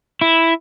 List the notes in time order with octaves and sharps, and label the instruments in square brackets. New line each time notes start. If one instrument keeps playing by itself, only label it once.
[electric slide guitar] E4